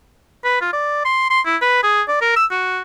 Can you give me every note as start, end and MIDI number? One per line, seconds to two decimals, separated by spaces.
0.45 0.58 71
0.61 0.72 65
0.73 1.03 74
1.05 1.30 84
1.30 1.41 84
1.45 1.56 64
1.62 1.82 71
1.83 2.02 68
2.09 2.18 74
2.22 2.33 70
2.36 2.45 88
2.51 2.81 66